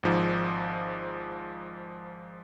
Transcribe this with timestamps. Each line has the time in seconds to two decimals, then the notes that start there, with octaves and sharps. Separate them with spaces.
0.03 G#1 G#2 F3